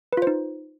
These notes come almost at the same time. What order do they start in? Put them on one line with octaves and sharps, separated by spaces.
B4 F4 C5 D#4